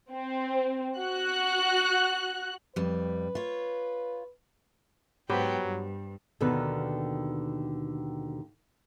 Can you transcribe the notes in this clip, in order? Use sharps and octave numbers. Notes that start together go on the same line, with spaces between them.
C4
F#4 F#6
F2 G3 B4
F4 C#5
G#2 F#3 B3 G4 B4 C5 G5
G2
D#2 B2 D3 D#3 B3 B4